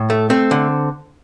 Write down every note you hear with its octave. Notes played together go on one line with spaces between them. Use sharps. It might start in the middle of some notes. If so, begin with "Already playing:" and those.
Already playing: A2
A3
A3 C4
D3